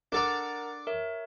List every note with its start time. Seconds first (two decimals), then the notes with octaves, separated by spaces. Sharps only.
0.12 D4 A4 A#4 D5 F#5 A#5
0.87 A#4 C#5 E5